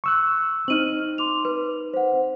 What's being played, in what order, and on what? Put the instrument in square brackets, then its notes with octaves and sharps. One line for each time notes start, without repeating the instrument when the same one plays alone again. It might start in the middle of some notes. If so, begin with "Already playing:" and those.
[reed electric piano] C#6 E6 F#6
[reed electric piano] C4 D#4 [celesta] F6 D#7 F#7
[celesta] C6 D6 F7
B4
C5 F#5